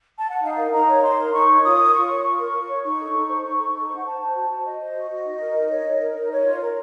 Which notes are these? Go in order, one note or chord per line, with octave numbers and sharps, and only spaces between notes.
A5
F#5
D#4 F5
A#4
D#4 A#5
C#5
D#4 C6
A#4
D#4 C#6
C#5
F4 D#6
A#4
F4 C#6
C#5
F4 C#6
A#4
F4
C#5
D#4 C#6
A4
D#4
C5
D#4 C#6
A4
D#4
C5
F#5
C5 A5
C5
F#4
F#4
C5 D#5
C5
F#4
F#4
D#4
A#4
D#4
C#5
D#4
A#4
D#4
C#5
F4
A#4